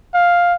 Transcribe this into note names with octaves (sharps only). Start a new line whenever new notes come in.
F5